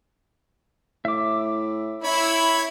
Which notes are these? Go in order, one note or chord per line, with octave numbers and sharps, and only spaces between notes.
A2 E5 D6
E4 C#5 B5